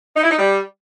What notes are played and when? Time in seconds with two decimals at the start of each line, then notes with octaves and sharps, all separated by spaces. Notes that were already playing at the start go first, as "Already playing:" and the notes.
0.16 D#4
0.24 E4
0.31 D#4
0.38 G3